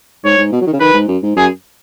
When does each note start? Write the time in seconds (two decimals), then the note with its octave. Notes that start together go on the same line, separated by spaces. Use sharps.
0.24 G#2 C#5
0.38 G#2
0.52 B2
0.61 F#3
0.67 D#3
0.73 C#3
0.80 D#3 B4
0.94 G#2
1.08 F#2
1.23 G#2
1.36 F#2 G#4